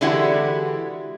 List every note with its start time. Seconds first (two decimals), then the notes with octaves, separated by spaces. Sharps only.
0.01 D3 E3 G#3 E4 F#4 G4